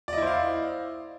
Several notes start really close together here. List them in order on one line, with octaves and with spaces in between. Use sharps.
D5 D#5 E4 C5 F5